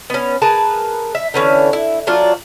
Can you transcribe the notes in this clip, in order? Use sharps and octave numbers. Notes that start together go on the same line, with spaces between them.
B3 C#4
G#4 A#4 B4 A5
E5
D3 E3 C#4
E4
F#3 D4 F4